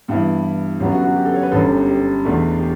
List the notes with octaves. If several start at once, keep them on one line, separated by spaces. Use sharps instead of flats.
G2 E3 B3 E4 G4
F#2 D3 F#3 B3 G4
F#4
F#4
G4
A4
C#5
B4
G1 F#2 D3 A4
G4
G4
E2 B2 A3 D4
G4